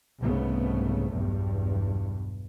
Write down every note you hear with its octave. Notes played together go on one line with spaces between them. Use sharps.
C2 G#2 C#3 A3 B3
B1 E2 G2